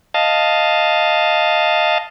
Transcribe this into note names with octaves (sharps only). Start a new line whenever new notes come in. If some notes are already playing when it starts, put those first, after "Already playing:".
D#5 F5 A5